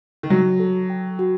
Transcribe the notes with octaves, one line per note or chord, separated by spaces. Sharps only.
D#3
F#3 F#4
A4
G5
F#4